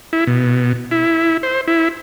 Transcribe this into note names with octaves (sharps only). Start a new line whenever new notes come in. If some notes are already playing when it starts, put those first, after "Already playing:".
E4
B2
E4
C5
E4